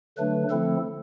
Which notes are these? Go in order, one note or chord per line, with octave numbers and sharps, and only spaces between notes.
D3 F#3 A3 D4 B4
D3 F3 A3 C4 E4 A4